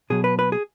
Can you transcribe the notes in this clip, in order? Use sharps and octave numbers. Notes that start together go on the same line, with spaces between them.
B2 F#3 G#4
B4
B4
G#4